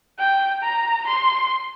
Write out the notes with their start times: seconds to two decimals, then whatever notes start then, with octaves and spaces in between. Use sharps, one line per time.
0.19 G5
0.62 A#5
1.07 C6